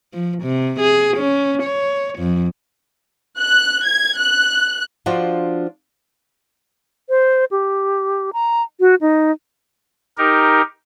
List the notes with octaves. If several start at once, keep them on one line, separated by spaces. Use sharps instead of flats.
F3
C3
G#4
C#4
C#5
F2
F#6
G#6
F#6
F3 D4 F4 F#4
C5
G4
A#5
F#4
D#4
D#4 G4 A#4